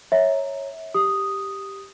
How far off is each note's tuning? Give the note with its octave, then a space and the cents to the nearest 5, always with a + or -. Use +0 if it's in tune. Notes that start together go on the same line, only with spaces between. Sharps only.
C#5 -5 E5 -25 A#5 +0
G4 +0 D#6 +0